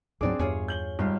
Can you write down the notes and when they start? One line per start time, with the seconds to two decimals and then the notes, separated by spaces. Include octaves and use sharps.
0.21 D2 G#2 F#3 C4 D4 G#4 D5 D6
0.39 G1 E2 G2 F4 G#4 C#5
0.68 G6 F#7 G7
0.99 G#1 G3 F4